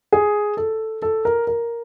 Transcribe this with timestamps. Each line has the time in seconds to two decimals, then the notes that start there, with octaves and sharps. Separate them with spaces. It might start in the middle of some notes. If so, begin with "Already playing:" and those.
0.13 G#4
0.57 A4
1.02 A4
1.25 A#4
1.47 A#4